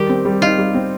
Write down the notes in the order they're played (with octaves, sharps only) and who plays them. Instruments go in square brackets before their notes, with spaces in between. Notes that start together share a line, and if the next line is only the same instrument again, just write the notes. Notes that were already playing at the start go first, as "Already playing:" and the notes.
Already playing: [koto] D#3 G4 [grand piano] G3
[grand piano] C4
G3
[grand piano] D#4 [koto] F4
[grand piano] G3
C4